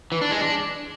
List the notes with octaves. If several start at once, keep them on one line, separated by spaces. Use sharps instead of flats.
E3
D4
G#3
D4